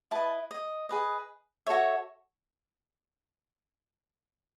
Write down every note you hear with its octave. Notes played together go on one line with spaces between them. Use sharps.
E4 B4 D#5 A5
D#5
G#4 B4 D#5
F#4 A4 C#5 E5